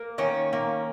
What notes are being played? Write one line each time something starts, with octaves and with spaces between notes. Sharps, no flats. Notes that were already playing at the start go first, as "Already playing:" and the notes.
Already playing: A#3
D#3 C#4
A#3